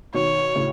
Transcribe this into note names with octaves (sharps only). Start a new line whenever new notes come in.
B2 D#3 C#5
A2 C#3